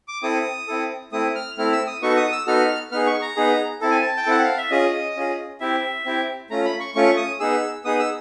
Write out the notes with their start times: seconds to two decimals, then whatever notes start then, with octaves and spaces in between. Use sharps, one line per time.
0.08 D6
0.23 C4 E4 A4 D#6
0.68 C4 E4 A4
1.12 A3 C4 E4 D#6
1.35 F6
1.58 A3 C4 E4 F6
1.72 E6
1.87 D#6
2.02 B3 D#4 F#4 A4 C#6
2.17 D#6
2.32 E6
2.47 B3 D#4 F#4 A4 F6
2.91 B3 D#4 G#4 F6
3.07 C#6
3.22 A#5
3.36 B3 D#4 G#4
3.81 C4 E4 A4 A5
3.91 G#5
4.00 A5
4.17 G5
4.26 C4 E4 A4 F#5
4.44 F5
4.57 E5
4.71 C#4 F4 G#4 D#5
5.16 C#4 F4 G#4
5.60 C4 E4 G4 E5
6.05 C4 E4 G4
6.50 A3 C#4 F4 A#5
6.65 B5
6.80 C#6
6.95 A3 C#4 F4 C#6
7.17 D#6
7.40 B3 D#4 G#4 E6
7.85 B3 D#4 G#4 D#6
7.99 E6